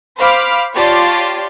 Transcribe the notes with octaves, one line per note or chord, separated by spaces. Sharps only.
C5 F5 B5 D6 F6
F4 G4 C#5 D5 A5 C6